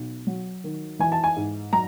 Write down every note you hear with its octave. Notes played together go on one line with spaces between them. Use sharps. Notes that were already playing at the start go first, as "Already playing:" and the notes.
Already playing: B1
F#3
D#3
E3 G#5
A5
G#5
G#2
F#3 A#5